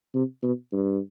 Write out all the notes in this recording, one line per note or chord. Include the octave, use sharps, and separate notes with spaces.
C3
B2
G2